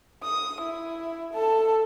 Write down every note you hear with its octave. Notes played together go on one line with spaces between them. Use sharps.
D#6
E4
A4 A5